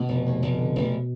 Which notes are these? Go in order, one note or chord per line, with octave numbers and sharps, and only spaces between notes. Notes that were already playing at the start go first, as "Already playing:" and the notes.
Already playing: B2 B3
F1
D#2
F1
D3
F1